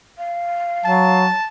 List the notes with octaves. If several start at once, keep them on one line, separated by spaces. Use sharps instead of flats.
F5
F#3 A5